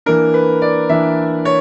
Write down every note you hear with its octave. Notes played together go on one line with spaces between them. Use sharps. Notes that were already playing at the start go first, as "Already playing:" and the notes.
E3 A#3 D4 A#4
B4
D5
E3 A#3 D4 E5
C#5